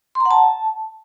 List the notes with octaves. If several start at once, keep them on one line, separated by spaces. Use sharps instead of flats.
C6
A#5
F#5
A5